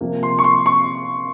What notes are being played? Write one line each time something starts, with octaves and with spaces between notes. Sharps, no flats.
C3 F3 A#3
C6
C#6
C6
C#6